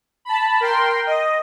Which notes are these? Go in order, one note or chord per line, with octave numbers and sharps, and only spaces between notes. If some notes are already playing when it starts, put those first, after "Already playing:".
A5 B5
A#4 G5 C6
D#5